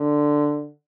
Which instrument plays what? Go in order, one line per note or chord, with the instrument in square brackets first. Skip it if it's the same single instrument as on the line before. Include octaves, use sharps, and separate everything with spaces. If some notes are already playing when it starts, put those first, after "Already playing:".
Already playing: [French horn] D3